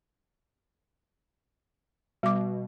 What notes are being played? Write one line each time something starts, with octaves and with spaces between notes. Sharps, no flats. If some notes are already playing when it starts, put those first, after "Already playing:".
B2 G3 D6